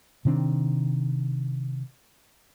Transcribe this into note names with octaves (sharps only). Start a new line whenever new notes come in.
C3 D#3 C4 D4